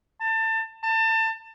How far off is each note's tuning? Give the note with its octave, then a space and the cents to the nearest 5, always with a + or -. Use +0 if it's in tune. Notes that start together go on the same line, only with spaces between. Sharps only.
A5 +25
A5 +30